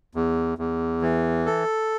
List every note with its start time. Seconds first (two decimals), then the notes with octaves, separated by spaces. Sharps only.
0.15 E2
0.58 E2
1.02 E3
1.46 A4